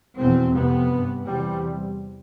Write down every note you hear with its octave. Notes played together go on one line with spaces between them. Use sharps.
E2 B2 C4
F2 C3 B3
G2
E2 C3 G3